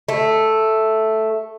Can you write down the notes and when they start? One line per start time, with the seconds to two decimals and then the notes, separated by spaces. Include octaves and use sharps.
0.08 A3